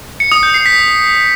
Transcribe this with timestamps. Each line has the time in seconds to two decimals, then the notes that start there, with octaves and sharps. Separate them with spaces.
0.20 C#7
0.32 D#6
0.43 G6
0.54 C7
0.66 B6